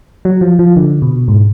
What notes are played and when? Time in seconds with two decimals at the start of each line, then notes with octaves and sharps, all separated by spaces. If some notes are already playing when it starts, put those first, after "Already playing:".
0.25 F#3
0.41 F3
0.59 F3
0.76 D3
1.02 B2
1.28 G#2